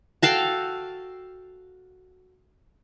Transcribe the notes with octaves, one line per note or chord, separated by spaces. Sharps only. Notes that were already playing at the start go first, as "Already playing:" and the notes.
F#4 A4 F5 G5